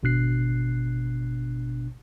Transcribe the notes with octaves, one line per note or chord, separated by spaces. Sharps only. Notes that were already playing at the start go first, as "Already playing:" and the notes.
G#1 B2 D4 F#6 C7